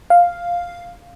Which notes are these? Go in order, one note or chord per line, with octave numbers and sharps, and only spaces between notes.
F5